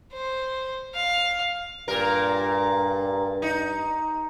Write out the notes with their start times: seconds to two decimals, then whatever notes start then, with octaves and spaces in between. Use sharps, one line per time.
0.12 C5
0.94 F5
1.88 G2 A#2 A#4
3.42 D#4